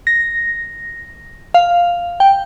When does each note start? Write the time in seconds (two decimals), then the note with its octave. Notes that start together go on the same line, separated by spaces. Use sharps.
0.07 A#6
1.54 F5
2.20 G5